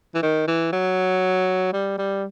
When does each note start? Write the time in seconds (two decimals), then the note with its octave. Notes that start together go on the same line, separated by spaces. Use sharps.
0.15 E3
0.23 D#3
0.48 E3
0.73 F#3
1.73 G3
1.98 G3